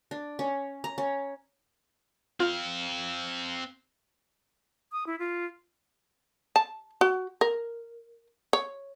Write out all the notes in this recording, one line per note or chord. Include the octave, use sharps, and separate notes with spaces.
D4
C#4
A#5
C#4
C4 F4 F5
D#6
E4
F4
A5
F#4
A#4
C#5